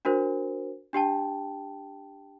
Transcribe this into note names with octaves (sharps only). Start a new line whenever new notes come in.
D4 F#4 A#4 C5
D4 G4 G5 A5